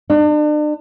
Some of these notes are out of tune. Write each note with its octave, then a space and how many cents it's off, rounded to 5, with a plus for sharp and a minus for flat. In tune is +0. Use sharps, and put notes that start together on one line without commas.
D4 +40